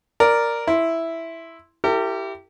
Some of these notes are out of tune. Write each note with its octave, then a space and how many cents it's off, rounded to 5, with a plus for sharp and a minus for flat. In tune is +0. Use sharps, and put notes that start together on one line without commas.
A#4 +0 D5 +0
E4 +0 C6 +0
E4 +15 G4 -10 A#4 -45